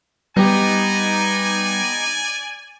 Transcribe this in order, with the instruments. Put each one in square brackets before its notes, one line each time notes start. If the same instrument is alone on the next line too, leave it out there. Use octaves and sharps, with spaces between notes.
[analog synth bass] G3 [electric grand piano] B3 G4 [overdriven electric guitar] D#4 [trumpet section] D5 G#5